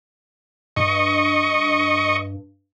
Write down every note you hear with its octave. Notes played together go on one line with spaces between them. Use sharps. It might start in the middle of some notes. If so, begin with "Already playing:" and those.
G2 D#5 C#6